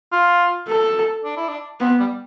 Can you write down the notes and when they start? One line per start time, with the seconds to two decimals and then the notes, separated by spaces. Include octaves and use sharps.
0.12 F4
0.68 A4
1.25 D4
1.37 E4
1.48 D4
1.80 B3 C4
1.99 G3